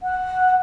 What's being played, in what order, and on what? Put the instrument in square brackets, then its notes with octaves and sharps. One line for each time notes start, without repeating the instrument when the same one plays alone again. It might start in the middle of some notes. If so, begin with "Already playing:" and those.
[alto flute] F#5